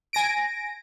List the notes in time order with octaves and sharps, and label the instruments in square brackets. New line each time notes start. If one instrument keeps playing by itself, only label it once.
[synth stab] G#5 A#6 D7